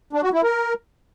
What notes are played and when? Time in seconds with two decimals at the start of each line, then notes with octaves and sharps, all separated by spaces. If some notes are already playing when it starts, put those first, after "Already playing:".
0.13 D4
0.23 F#4
0.33 E4
0.43 A#4